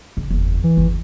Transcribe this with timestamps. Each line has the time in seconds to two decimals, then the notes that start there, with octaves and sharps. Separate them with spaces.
0.17 F#1
0.31 F#1 E2
0.64 E3
0.77 G1 E2